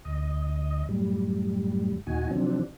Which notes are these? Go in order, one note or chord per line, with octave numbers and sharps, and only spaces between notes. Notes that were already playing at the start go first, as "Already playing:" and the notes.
D2 D#5
F#2 A2 G3
D#2 A#2 D#4 F#4 G#5
C3 D#3 F3 F#3 C4 D4